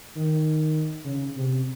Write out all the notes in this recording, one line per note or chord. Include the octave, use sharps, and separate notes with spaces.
D#3
C#3
C3